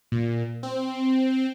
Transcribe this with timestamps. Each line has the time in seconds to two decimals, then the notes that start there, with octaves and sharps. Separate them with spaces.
0.12 A#2
0.63 C4